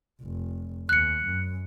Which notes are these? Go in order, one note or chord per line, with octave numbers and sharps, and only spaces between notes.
F1
D#2 F#6 C#7
F#2